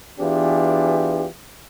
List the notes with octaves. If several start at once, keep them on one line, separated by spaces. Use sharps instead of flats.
E3 B3 D4 F4 G4 G#4